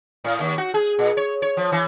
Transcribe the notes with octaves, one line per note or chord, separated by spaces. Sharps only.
A2
D#2
F#4
G#4
A#2
C#5
C#5
F3
E3